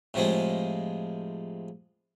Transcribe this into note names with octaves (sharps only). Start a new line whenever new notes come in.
A2 C3 F3 G#3